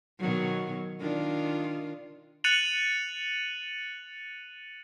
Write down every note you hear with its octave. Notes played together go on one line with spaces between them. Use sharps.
B2 D#3 F#3
D#3 D4 F4
F#6 A6 C#7 D#7 F7 F#7